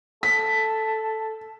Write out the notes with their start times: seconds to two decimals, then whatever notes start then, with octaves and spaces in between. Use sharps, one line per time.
0.23 A4 B6